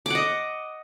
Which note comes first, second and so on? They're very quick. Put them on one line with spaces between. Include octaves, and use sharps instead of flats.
D6 F#5 D#5